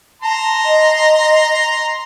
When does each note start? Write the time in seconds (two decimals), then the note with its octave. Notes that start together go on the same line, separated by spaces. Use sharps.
0.22 A5 A#5 C6
0.64 D#5